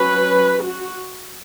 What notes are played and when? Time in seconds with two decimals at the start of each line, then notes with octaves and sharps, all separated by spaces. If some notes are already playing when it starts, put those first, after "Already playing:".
Already playing: F#3 C#4 B4
0.64 F#4